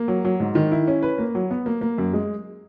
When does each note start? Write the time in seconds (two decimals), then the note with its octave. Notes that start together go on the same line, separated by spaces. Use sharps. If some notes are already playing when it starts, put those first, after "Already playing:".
Already playing: A#3
0.08 F#3
0.25 F#3
0.40 G#2
0.55 D#3
0.72 E4
0.88 C#4
1.02 B4
1.18 A#3
1.35 F#3
1.51 B3
1.66 A#3
1.81 A#3
1.98 F#2
2.13 G#3